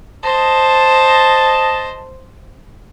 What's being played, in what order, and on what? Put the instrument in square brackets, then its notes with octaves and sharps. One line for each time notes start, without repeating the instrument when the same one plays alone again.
[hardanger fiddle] C5 [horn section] D#5 A5